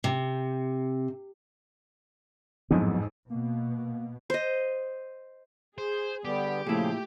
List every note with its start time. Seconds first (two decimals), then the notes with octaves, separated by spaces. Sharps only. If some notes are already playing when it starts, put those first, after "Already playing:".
0.04 C3
2.71 A1 F2 G#2 F3 F#3 B3
3.30 B2 A#3
4.30 C5 D#5
5.78 G#4 C5
6.25 D3 G3 B3 G4
6.66 A#2 C#3 F3 A3 E4 G#4